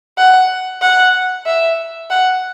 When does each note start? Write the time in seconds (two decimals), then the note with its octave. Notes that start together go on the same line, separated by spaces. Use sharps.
0.18 F#5
0.81 F#5
1.46 E5
2.10 F#5